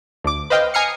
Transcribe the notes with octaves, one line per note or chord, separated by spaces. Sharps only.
D2 D6
B4 C5 D#5 F5 G5
G#5 A#5 D#6 F6 C7 C#7